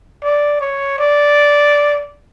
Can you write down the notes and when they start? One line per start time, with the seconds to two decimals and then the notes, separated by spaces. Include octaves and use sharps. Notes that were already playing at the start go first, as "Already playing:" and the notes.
0.23 D5
0.61 C#5
0.99 D5